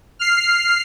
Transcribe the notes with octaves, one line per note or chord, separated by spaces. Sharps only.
F6 C7